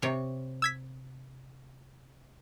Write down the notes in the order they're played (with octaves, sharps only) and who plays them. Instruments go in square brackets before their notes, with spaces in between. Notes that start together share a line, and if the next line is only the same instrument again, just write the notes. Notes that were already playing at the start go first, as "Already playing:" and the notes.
[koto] C3 C#5
[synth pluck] E6 G#6 B6